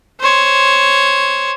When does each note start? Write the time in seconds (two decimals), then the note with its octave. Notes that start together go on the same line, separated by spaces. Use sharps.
0.20 C5 C#5